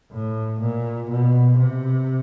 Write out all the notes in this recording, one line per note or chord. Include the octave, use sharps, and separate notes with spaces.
A2
A#2
B2
C3